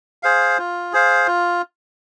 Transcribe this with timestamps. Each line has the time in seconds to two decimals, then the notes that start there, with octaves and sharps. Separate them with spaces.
0.23 G#4 C5 F5
0.58 F4
0.93 G#4 C5 F5
1.27 F4